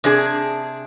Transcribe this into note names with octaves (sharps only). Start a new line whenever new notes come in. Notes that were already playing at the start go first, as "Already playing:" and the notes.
C3 D4 G#4